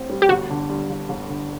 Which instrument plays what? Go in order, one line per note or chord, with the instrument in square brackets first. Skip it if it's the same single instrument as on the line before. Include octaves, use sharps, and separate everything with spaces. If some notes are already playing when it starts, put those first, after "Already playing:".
Already playing: [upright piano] A1 A2 C4
G3
[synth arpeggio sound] G4
[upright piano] G1 [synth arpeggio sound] F#4
[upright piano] D3
G2
G1
G1
D3